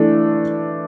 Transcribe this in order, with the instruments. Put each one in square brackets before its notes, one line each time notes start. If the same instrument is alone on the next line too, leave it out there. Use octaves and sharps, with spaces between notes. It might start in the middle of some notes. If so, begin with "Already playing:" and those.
Already playing: [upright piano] E3 A3 D4